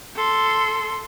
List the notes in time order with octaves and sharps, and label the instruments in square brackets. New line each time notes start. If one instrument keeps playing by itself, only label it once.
[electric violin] A4 C6